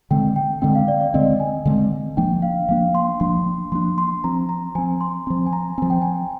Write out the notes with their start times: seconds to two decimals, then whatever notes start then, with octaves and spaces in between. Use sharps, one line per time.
0.11 D3 G#3 C4 G5
0.36 G5
0.62 D3 G#3 C4 G5
0.75 F5
0.88 D5
1.01 D5
1.14 D3 G#3 C4 D#5
1.40 G#5
1.66 D3 G#3 C4
2.17 F3 A#3 D4 G5
2.42 F5
2.69 F3 A#3 D4 F5
2.95 C6
3.20 F3 A#3 D4 C6
3.72 F3 A#3 D4 C6
3.98 C6
4.24 F3 C4 A#5
4.49 A#5
4.75 F3 C4 G#5
5.01 C6
5.26 F3 C4 C6
5.46 G#5
5.53 A#5
5.78 F3 C4 G#5
5.90 G5
6.02 G#5